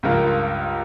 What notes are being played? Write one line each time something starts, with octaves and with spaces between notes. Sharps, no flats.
C#2 G2 F4 A#4